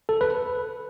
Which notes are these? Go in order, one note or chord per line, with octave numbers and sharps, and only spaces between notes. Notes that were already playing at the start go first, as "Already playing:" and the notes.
A4
B4